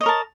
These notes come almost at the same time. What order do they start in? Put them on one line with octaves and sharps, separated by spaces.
D#5 C#5 A#4 A5